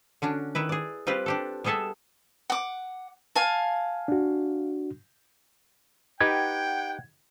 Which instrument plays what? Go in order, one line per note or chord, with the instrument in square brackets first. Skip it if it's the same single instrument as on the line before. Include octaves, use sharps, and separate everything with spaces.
[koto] D3 C#4 D4 F#4
D#3 E4 B4
G#4 D5
G3 C4 F4 G4 B4
D4 G4 A4
G3 B3 G#4 A4 E5 A5
[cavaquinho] F#5 D6
F5 G#5 A5
[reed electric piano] D4 F#4
[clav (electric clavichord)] D#4 G4 B4 [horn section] F#5 G5 [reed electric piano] G#6